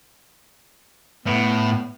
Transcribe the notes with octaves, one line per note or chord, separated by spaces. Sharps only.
A2 B3